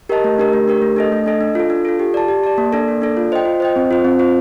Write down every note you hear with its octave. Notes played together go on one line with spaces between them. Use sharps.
G4 A#4 D#5 A5
A3
D4 G4 A#4
A3
D4 G4 A#4
A3
D4 A4 D#5
A3
D4 A4 D#5
D4
F4 A4
D4
F4 A4
G4
D5 A5
G4
D5 A5
A#3
D4 A4 D5
A#3
D4 A4 D5
F4
C5 D#5 G5
F4
C5 D#5 G5
C4
F4 C5
C4
F4 C5